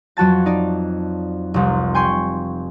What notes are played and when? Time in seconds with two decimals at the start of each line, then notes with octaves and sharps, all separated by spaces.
0.17 F2 F#3 F#4 A5 A6
0.46 D#4 D5
1.54 F1 C2
1.95 G5 G#5 C6 C#6